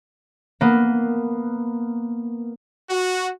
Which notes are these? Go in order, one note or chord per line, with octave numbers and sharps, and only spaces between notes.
A#3 B3
F#4